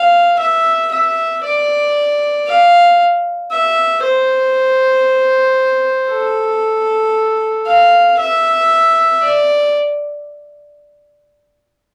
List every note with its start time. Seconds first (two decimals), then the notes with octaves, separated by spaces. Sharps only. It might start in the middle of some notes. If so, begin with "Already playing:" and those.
Already playing: F5
0.39 E5
0.92 E5
1.44 D5
2.47 F5
3.51 E5
4.03 C5
6.11 A4
7.67 F5
8.19 E5
9.22 D5